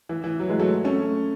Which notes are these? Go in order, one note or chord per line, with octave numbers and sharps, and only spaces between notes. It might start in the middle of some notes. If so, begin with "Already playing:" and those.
E3
E3
F#3
E3 G#3
F#3 A3
A3 C#4